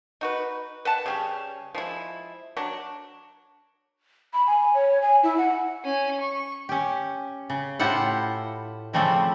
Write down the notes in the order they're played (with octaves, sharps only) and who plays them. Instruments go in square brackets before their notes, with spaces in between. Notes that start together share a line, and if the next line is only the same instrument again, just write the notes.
[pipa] D#4 F#4 B4
B4 F#5 A5
C#3 G3 C#4
F3 G#3 E4
F#3 D4
[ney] B5
G#5
C#5
G#5
E4
F#5
[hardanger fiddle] C#4 G#5
C#6
[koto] C#4 G4
C#3
A2 E4 F4 G4 C5 F#5
C#3 F3 G3 A3 C4 E4